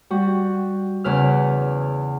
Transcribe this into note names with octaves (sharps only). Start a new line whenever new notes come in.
G3 F#4
E2 C#3 B4 F6